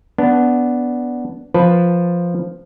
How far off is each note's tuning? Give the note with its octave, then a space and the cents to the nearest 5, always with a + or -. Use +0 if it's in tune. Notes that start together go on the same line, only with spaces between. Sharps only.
B3 +0 D4 -15
F3 +0 B4 +0 A5 +0